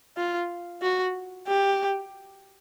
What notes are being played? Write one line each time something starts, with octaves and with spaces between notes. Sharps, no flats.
F4
F#4
G4